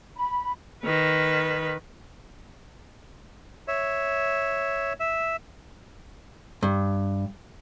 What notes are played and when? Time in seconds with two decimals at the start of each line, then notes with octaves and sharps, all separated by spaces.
0.15 B5
0.83 D#3 B4
3.68 C#5 E5
5.00 E5
6.63 G2